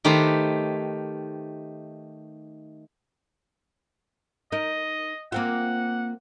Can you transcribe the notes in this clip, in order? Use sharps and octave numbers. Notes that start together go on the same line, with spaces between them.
D#3 A3 D#4 G4 B4 C5
D#4 A#4 D#5
A#3 C4 F4 F#5